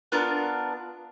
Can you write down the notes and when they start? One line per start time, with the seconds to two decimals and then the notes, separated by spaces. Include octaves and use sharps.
0.12 B3 D4 F4 A#4